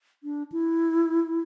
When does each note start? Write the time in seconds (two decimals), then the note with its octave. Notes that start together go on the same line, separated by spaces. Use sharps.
0.23 D4
0.52 E4